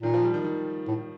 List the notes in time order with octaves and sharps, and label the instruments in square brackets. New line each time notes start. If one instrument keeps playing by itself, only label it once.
[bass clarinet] A#2 [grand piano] D#3
[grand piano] F3
G3
D#3
D#3
[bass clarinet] A2